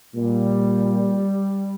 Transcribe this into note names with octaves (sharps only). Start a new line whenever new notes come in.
A#2 G3